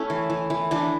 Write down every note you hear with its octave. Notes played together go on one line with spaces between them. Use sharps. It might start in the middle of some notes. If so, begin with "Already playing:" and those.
Already playing: A3 C#4 E4
E3
E3
E3
E3 D4